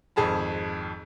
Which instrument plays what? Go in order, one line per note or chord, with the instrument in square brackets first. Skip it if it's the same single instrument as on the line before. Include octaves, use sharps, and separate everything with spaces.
[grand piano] G#1 F2 G#4 A5 B5